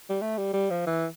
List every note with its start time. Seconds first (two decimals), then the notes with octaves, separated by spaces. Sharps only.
0.10 G3
0.22 A3
0.38 G3
0.54 G3
0.70 F3
0.87 E3